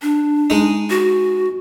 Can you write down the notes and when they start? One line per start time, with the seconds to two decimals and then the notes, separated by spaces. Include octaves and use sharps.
0.02 D4
0.50 G#3 D#4
0.90 F#4